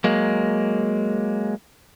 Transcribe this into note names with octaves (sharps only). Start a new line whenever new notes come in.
F#3 G#3 A#3